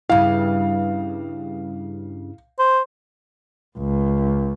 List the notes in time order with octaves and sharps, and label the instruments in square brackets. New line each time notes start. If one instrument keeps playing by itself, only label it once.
[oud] G2 C#3 [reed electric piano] E4 [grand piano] F5
[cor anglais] C5
[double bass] C#2